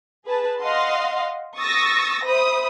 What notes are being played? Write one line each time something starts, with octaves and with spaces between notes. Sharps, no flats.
G#4 B4 A5
D#5 F5 F#5 C6
C#6 D#6 E6 A6 A#6
C5 E5 B5 D#6